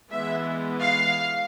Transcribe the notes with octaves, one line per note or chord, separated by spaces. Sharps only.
E3 G#3 B3 E5
F5